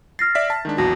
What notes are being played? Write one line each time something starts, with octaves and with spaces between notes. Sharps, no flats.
F6 A6 A#6 C7
D5 E5 B6
A5
D#3 G#3 D4
B1 E2 A#2 F#4 A5 A#6